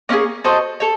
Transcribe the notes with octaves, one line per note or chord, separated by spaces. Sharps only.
A#3 C#4 F4 G#4
F#4 A4 C5 D#5
A4 C#5